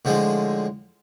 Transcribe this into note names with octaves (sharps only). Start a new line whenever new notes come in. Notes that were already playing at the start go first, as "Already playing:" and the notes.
A2 D3 F3 G#3